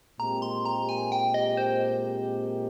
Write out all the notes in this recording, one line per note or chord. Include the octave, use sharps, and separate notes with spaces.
A#2 G#3 C4 G4 A#4 A#5
C6
A#5
G#5
G5
D#5
C5